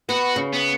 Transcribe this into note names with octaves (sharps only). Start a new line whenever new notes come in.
B3 F#4
C#3
B3